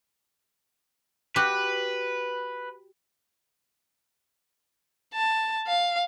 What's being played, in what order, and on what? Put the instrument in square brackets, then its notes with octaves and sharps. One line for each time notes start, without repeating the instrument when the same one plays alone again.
[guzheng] F#4 G4 [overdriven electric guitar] B4
[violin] A5
F5